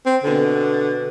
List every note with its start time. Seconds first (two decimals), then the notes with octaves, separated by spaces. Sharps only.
0.06 C4
0.24 B2 D3 A#4 G#5